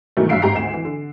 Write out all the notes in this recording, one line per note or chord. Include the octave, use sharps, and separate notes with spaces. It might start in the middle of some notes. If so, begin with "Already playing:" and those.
G#2 B2 D#3 E3 F#3 A3
G2 F#3 E5 F5 C7 D7
G#1 G#2 G4 A#5 C7
G#1 D2 C7 E7
E3
D3